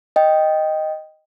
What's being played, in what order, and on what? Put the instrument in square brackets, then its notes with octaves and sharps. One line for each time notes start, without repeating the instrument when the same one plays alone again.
[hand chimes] D#5 G5